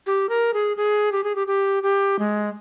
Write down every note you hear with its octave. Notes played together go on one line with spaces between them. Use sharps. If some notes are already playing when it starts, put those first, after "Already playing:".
G4
A#4
G#4
G#4
G4
G#4
G4
G4
G4
G#3